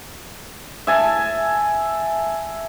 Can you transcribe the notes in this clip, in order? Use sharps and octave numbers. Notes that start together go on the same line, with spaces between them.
E5 G#5 A5